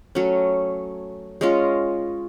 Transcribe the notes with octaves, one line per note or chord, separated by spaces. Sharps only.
F#3 A3 C#4
G#3 C#4 F4